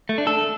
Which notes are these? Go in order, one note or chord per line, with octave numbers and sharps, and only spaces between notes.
A3
D4
A4